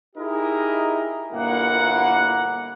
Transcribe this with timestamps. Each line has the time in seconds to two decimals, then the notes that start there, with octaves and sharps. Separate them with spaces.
0.16 D#4 E4 G4 G#4 A#4 D#5
1.33 G1 A#2 A#3 E4 F#5